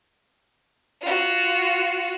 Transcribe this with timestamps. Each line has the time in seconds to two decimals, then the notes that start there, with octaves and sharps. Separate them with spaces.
1.01 F4 F#4